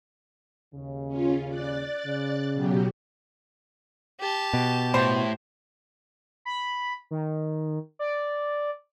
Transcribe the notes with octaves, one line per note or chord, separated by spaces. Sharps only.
D#2 C#3
C#4 F4
D5 F#6 A6
C#3
B2 F#3 G4
G4 A5
B2
A2 C5 C6
B5
D#3
D5